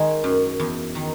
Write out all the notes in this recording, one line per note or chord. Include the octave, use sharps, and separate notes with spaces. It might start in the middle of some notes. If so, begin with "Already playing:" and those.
Already playing: D#3 G#3
F#2
E2
D#3